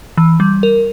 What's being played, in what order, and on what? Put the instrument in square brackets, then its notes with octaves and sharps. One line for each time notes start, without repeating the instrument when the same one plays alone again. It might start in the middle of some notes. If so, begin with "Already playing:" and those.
[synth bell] E3
G3
A#4